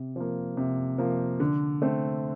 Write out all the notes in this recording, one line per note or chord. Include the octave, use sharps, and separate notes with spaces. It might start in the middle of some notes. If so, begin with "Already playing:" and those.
Already playing: C3
F3 A#3
C3
F3 A#3
D3
A3 C4